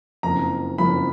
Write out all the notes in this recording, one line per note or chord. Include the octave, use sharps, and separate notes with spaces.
F#1 F2 F3 A#3 A#5
F#1 F2 F3 A#3 B5